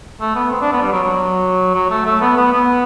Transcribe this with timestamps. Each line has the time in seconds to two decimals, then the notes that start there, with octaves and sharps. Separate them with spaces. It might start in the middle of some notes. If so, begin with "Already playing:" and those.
0.21 A3
0.35 B3
0.51 C4
0.61 D4
0.72 B3
0.82 G3
0.92 F#3
1.03 F#3
1.75 F#3
1.90 A3
2.05 A3
2.21 B3
2.37 B3
2.52 B3